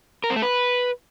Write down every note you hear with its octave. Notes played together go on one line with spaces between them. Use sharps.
A#4
C4
A3
B4